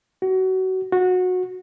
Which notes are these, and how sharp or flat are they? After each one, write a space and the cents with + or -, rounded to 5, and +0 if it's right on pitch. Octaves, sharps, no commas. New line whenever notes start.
F#4 +25
F#4 -20